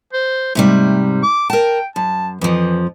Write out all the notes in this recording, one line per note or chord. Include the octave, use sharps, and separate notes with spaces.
C5
G#2 C3 G3 A3
D6
A#4 G5 A5
F#2 A5
F2 E3 F3